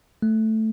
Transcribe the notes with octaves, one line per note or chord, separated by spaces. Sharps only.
A3